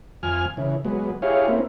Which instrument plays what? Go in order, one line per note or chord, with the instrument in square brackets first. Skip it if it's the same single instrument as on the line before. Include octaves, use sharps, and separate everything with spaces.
[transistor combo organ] F2 G#5 F6
C#3 E3
F#3 G#3 B3
E4 G4 G#4 C#5 F5
A#3 C4 C#4 E4